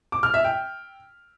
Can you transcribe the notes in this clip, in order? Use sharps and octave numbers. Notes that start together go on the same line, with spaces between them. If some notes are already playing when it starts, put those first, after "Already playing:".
D6
F6
E5
G5